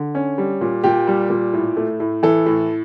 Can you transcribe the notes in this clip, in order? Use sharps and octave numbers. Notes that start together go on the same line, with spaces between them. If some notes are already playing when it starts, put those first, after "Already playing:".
Already playing: D3
C#4
G3
A#2
A#2 G4
G3
A#2
A2
A3
A2
E3 A4
A2